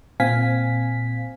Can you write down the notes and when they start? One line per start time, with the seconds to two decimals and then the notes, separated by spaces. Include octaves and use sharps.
0.20 A#2 C4 F5 G#5 B6